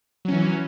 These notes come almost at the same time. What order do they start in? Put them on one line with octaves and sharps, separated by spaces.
F#3 C#4 E3